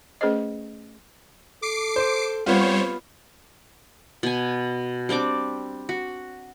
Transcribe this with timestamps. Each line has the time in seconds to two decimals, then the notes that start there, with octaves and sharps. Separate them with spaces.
0.21 A3 C#4 G#4 B4 C5 D#5
1.62 A4 D6 C7 D7
1.96 C5
2.46 G3 B3 C4 F4 C5 C#5
4.23 B2 G#5
5.09 G3 C4 D4 D6
5.89 F#4